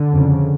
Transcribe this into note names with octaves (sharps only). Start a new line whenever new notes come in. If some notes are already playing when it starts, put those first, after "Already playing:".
Already playing: D3
F2 C#3